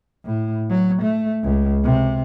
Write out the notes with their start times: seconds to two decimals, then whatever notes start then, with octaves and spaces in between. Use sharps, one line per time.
0.25 A2
0.70 F#3
1.02 A3
1.44 C#2
1.84 C3